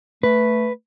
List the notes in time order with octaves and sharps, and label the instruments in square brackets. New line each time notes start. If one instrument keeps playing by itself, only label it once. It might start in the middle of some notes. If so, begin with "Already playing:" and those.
[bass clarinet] A3 [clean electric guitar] B4